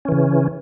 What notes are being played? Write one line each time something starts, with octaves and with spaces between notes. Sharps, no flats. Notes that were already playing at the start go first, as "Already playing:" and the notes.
C#3 E3 C#4